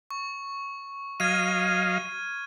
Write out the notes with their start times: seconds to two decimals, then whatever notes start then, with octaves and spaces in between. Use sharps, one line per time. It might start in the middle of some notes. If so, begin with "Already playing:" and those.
0.11 C#6
1.20 F#3 D#5 F5 F6 G#6 D#7